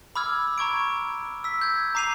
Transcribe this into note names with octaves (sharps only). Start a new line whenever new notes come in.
B5 D6 E6 F6 G#6
A#5 C#6 G#6 D7
E6 B6
G6 G#6
A#5 D6 C7 D#7 F7